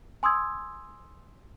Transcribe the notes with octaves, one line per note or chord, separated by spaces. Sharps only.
G#5 C6 D#6 E6 G#6